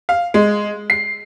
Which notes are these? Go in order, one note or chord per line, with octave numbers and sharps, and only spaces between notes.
F5
G#3
C7